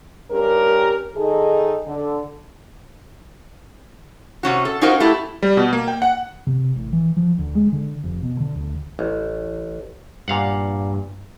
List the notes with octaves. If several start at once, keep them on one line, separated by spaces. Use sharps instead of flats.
G2 C#4 G4 A#4
D#3 D#4 G#4 A4
D3
C3 C#4 F#4
A4
C#4 D#4 F4 F#4 A#4 C5
A3 E4 G4
G3
B2
A#3
G5
F#5
C3
A1
E3
F3
D2
G#3
D3
F1
B2
D3
D2
A1
G2 A#2 F5 F#5